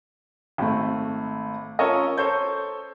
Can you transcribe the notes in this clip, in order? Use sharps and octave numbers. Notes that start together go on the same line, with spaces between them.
G#1 A3
C#4 F4 A4 A#4 C#5 D#5
A4 C5 C#5 C#6 G6